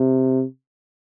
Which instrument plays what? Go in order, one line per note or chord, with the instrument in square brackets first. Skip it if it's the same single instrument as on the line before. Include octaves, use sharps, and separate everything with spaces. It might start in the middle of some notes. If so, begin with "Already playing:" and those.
Already playing: [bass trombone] C3